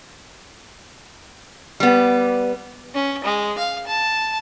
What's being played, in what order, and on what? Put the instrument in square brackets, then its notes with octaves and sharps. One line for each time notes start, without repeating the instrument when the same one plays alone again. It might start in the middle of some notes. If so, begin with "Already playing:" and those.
[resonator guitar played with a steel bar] G3 B3
[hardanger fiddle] C#4
G#3
F5
A5